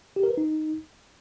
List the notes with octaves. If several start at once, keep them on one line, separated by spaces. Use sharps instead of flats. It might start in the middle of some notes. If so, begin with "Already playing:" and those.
G4
A#4
B4
D#4